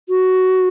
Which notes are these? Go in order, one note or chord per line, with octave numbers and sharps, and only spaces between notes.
F#4